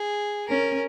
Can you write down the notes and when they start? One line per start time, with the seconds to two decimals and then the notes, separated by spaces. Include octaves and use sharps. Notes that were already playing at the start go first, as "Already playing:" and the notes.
Already playing: G#4
0.49 C#4 A#4